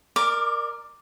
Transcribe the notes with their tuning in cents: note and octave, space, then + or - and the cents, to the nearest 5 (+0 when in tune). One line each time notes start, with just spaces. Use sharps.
A#4 +0 D5 +30 D6 +0